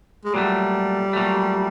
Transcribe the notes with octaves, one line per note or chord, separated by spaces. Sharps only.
G#3
A#2 F#3 G3 A3
A#2 F#3 A3